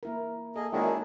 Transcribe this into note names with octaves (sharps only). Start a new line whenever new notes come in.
A#3 E4 A#4
A#3 G#4 A4 D#5
F#2 D#3 G#3 A#3 D4 E4 G#4